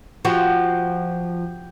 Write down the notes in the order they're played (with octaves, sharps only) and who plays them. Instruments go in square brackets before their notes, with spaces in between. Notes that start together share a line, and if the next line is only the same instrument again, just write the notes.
[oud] F3 [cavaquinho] F#4 G4 F#5